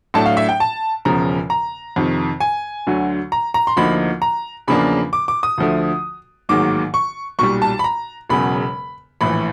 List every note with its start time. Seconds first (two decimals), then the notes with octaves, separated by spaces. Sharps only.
0.14 A2 F#3 A3 D4 A5
0.26 F5
0.37 E5
0.49 G5
0.60 A5
1.05 E1 E2 C#3 F3 A#5
1.50 A#5
1.96 F2 C3 D#3
2.40 G#5
2.87 D2 D3 F#3
3.32 A#5
3.54 A#5
3.67 C6
3.77 D2 D3 F3 A#3 D#4 B5
4.22 A#5
4.68 E2 C#3 F3 A#3 D4 B5
5.13 D6
5.28 D6
5.43 D#6
5.58 D2 D3 F3 A3
6.49 A1 G#2 D#3 F#3 A#3 D6
6.94 C#6
7.39 B1 A#2 G3 C#6
7.62 A5
7.79 B5
7.84 A#5
8.29 E1 E2 C#3 F#3 B5
9.21 A#1 A2 E3 B5